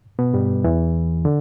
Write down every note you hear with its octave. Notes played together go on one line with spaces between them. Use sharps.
B2 B3
G2 G3
E2 E3
D3